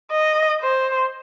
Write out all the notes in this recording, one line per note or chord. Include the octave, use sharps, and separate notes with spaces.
D#5
C5